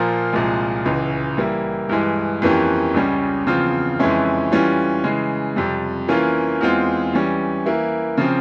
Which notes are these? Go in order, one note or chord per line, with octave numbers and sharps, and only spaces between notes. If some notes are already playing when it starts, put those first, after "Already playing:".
Already playing: A#2 F3 A#3 F4
C2 A#2 F3 G#3
C#2 C#3 E3
E3 G3 A#3 E4
G2 E3 G#3
F2 E3 A#3 C#4 G4
C#2 C#3 G3 C#4
E2 C#3 F3 C4 F4
F2 E3 G#3 C#4 E4
E3 G3 C#4 F4
C#3 E3 G#3
F2 C3 G3
E3 A#3 C#4 F4
E2 E3 G#3 C4 F4
E3 G3 C#4
E3 A#3 E4
C#3 F3 C4